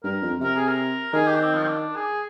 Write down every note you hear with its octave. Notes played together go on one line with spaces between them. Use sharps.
G2 A#4
F2
C3 A#4
G#4
A#4
D#3 G#4
G4
D4
C4
F3
C4
D4
G#4